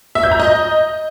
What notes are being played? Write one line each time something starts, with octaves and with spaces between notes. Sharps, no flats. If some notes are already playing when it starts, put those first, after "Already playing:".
E5
G6
A#5
D#5